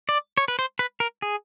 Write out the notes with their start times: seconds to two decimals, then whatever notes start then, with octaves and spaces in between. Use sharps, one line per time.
0.09 D5
0.38 C#5
0.48 B4
0.59 C5
0.79 B4
1.00 A#4
1.22 G#4